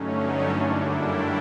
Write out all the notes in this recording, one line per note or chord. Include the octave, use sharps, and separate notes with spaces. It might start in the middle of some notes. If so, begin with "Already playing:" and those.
Already playing: G2 D3 F#3 A3 C#4 D#4
D4
F#2 D3 G3 A#3 D4 E4
G4 A4